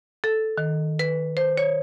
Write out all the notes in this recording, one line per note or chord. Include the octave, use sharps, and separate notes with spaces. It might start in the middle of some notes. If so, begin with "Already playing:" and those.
A4
D#3
B4
C5
C#5